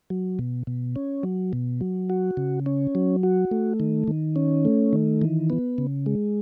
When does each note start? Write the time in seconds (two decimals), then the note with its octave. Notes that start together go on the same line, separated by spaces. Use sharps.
0.10 F#3
0.39 B2
0.67 B2
0.96 C#4
1.23 F#3
1.53 B2
1.81 F#3
2.10 F#4
2.37 C#3
2.66 C#4
2.95 F#3
3.23 F#4
3.51 A3
3.80 D#3
4.08 D#3
4.36 C#4
4.65 A3
4.93 D#3
5.22 E3
5.50 B3
5.78 C#3
6.06 G#3